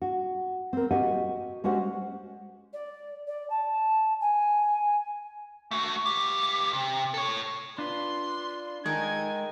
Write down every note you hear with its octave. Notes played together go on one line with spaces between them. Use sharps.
F#4
C4 A#4
F#4 G4 D#5 F#5 G#5
G#3 C#4 F#4 G4 C5 F#5
D5
D5
A5
G#5
A3 F#4
C#2 G4
C3
A4 C#5
D4 F4 B4 C6
D#3 G#3 A4 A#4 G#5 G#6